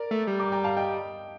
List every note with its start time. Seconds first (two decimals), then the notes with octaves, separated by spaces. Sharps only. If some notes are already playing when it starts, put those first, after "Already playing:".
Already playing: A#4 D5
0.11 A3
0.27 G3
0.39 A#5 D6
0.52 G5 A#5
0.64 F5 A5
0.77 D#5 G5